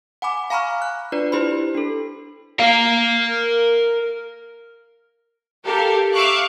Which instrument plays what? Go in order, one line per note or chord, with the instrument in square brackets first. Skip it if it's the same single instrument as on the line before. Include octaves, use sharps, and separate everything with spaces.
[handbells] F#5 G#5 B5 D6
F5 G#5 A#5 B5 C#6 F6
F#6
D4 F4 B4 D5
E4 G4 C5 B5
D4 A4
[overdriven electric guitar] A#4 F5
[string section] G4 A4 A#4 F5
E5 F5 C#6 D6 F#6